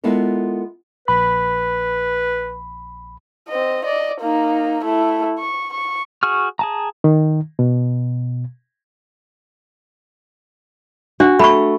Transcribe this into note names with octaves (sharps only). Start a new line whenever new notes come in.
G#3 B3 E4 F4 A4 A#4
A#1 B4 B5
C4 D#5
D5 D#5
A#3 D#4
A3 E4
C#6
C#6
F#4 G#4 C#6 F6
G#4 A5 A#5
D#3
B2
D4 F#4
A3 B5 C#6